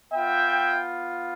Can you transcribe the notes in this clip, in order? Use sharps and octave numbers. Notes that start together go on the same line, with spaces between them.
B3 F4 E5 G5